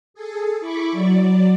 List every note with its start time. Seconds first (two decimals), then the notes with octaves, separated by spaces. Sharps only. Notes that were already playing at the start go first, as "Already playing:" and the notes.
0.14 G#4 A4
0.60 E4 B5 C#6 D6
0.92 F#3 D5